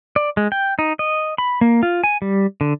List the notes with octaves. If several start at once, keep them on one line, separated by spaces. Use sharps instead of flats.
D5
G#3
G5
D#4
D#5
B5
A#3
F4
G#5
G3
D3